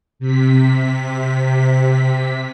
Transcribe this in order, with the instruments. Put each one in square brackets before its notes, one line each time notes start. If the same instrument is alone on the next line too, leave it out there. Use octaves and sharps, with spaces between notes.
[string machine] C3 B6